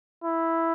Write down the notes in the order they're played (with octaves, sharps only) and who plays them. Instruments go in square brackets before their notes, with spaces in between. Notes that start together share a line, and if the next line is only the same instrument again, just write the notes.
[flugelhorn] E4